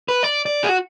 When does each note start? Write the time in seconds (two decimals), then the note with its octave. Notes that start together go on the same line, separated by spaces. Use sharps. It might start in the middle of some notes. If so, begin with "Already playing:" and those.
0.09 B4
0.23 D5
0.46 D5
0.64 G#4
0.69 F#4